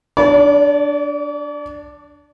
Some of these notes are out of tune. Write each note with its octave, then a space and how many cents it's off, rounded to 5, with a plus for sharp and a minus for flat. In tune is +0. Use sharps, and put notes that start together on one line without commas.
D4 +0 D5 -45